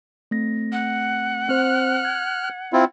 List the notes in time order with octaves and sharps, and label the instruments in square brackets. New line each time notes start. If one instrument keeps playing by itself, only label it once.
[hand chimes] A3 C4 A#6
[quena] F#5
[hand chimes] C4 C5 [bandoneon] F6 F#6
[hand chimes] G#6
[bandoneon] C4 E4 F4